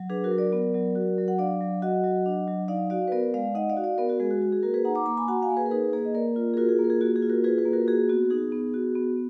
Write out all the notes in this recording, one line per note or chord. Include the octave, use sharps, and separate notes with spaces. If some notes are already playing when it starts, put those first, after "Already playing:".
Already playing: F#3
D4 G#4 B4
F#4 A#4
F#3
A#4 D5
B3
F#3
F#4
F#3
F#5
D4 D5 F5
F#3
F#4 D#5 F#5
F#3
D4
F#3
D#4 D5 F5
F#4 D5 F5
B4
B3 A#4 D5
G#3 D5 F5
D#4 D#5 F#5
D5 F5
F#4
D5 F5
B3 A#4 D5
F#4 A#4
G#3 G#4
F#4
F#4
G#4
A#3 F#4 A#4
G#4 B4
D#4 F#5 A#5
A#5 D6
A#3 A#5 D6
G#5 B5
F#4 F#5 A#5
F5 G#5
A#3
G#4 B4
A#4
D#4 G#4 B4
A#3 G#4
D#5
A#3 A#4 D5
F4
G#4
F4 F#4 A#4
G#4
A#3
A#4
G#4
A#3 F#4
G#4
F4
F#4 A#4
F4 G#4 B4
G#4 B4
A#3
F#4 A#4
F#4 G#4
B3 F#4
D#4 G#4
B3
F#4
B3